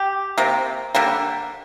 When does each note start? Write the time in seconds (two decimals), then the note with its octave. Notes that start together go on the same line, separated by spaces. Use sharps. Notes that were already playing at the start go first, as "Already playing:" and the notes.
Already playing: G4
0.38 C3 A#3
0.95 D3 G3 A#3